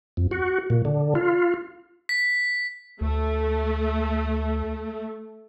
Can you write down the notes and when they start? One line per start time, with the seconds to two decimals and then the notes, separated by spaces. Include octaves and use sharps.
0.17 F2
0.31 F#4
0.70 A#2
0.85 D3
1.15 F4
2.09 B6
3.01 D2 A3